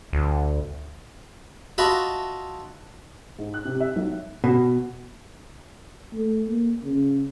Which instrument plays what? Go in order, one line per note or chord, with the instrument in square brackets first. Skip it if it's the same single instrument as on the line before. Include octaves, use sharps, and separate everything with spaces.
[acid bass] D2
[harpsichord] F4 F#4 D#5 E5 A5 B5
[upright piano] G#2
F#6
C3
E5
B1
[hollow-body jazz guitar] B2
[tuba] A3
A#3
C#3